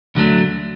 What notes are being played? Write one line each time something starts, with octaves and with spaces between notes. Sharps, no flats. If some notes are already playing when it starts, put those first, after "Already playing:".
D2 D3 F#3 A3